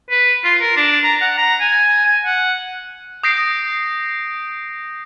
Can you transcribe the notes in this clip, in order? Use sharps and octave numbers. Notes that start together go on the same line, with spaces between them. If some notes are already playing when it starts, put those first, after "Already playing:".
B4
F4
A#4
D4
A#5
F#5
A#5
G#5
G#5
F#5
D#6 G6 A#6 C7 D7